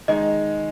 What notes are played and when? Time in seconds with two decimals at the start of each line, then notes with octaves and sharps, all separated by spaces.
0.08 D#3 G#3 D#4 D#5